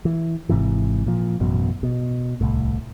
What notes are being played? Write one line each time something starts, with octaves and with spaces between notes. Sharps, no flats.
E3
G#1 G#2 C3 E3
A#2 F3
A1 F#2 B2
B2
D1 C2 A2